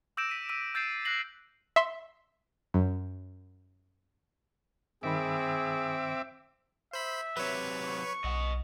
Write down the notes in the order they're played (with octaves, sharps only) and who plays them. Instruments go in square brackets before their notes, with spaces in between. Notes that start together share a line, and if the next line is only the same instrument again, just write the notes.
[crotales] D6 E6 G6 A#6 D7 E7
B6 D#7
E6 B6 D#7 E7
E6 G6 A6 C7 D7 E7
F#6 A6 A#6 C7 F#7
[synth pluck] E5 C6
F#2
[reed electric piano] G2 D#3 B5 [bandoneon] C4 [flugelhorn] G#4 [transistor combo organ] E5 D6
[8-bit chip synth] C5 B5 [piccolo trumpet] E5
[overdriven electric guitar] C3 F#3 [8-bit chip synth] B4 C#5
[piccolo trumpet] C#6
[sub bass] B1 [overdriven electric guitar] D#5 F#5